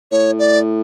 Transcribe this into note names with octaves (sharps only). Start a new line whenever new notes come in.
A2 C#5
D5